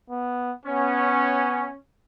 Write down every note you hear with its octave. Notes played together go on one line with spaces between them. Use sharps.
B3
B3 C#4